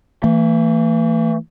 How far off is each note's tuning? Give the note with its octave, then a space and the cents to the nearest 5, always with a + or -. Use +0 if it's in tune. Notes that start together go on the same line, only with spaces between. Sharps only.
E3 +0 A3 +45